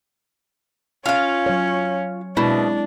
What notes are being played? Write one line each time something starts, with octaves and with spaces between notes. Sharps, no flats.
C#4 F4 F5
F#3 C#5
B2 G#3 C4 D4 E4